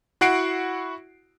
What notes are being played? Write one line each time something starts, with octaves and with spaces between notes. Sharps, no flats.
E4 F#4 F#5 C7 D7